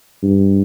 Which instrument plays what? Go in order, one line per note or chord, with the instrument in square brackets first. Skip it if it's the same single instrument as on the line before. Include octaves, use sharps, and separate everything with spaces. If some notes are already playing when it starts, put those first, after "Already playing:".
[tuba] G2